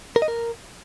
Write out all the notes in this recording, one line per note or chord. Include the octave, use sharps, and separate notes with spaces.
A#4
D#5
A#4